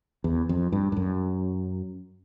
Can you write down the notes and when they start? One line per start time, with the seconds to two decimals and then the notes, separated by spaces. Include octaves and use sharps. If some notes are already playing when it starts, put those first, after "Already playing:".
0.24 E2
0.49 F2
0.72 G2
0.92 G2
0.97 F#2